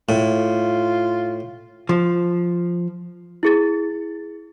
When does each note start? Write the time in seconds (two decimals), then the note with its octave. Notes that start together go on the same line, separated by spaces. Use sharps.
0.09 A2 F4
1.89 F3
3.43 E4 G#4 A6